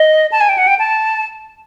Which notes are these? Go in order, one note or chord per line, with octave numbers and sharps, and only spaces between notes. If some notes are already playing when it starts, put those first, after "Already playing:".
Already playing: D#5
A5
G#5
G5
F#5
G5
A5